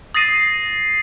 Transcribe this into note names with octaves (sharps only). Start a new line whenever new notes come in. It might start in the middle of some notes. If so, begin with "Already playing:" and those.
D#6 A6 A#6 C7 D#7